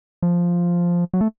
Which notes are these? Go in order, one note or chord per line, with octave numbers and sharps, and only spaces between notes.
F3
F#3
A3